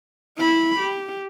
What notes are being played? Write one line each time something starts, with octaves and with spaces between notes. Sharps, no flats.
E4 B5
G4